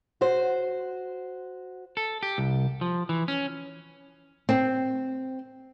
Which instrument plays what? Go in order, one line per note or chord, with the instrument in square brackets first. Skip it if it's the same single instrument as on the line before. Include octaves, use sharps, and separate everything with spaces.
[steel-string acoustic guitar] F#4 C5
[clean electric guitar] A4
G4
C2
F3
E3
C#4
[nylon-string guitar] C4